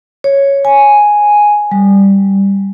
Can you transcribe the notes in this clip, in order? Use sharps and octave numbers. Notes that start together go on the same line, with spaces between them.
C#5
G#5
G3